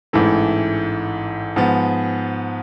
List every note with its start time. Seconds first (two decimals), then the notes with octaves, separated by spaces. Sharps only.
0.13 A1 G#2 E3 A3 E4
1.56 G#2 F3 B3